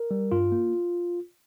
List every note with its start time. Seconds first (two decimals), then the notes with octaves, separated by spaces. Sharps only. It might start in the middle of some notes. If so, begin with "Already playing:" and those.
Already playing: A#4
0.11 G3
0.32 G2 F4
0.52 A#3